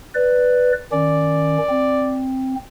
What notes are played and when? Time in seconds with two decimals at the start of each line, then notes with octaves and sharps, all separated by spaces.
0.15 B4 D5
0.92 D#3 C#4 D5
1.69 C4